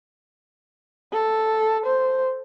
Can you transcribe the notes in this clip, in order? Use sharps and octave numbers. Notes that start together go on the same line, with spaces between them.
A4
C5